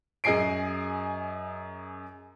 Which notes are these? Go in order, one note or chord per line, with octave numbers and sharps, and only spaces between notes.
F#2 G#4 D#5 G#5 C7 D7